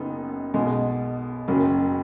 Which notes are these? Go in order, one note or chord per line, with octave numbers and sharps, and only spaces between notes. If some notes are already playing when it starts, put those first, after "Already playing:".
Already playing: F#1 F#2 C#3 B3 D#4
B1 B2 G#3
F#1 F#2 C#3 F#3 C#4